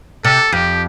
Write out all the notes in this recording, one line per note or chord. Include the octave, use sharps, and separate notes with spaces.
C3 A4
F2 G4